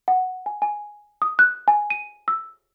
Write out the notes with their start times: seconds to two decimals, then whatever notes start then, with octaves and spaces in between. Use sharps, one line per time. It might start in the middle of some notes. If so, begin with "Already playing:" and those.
0.08 F#5
0.46 G#5
0.62 G#5
1.22 D#6
1.39 F#6
1.68 G#5
1.90 D#7
2.28 E6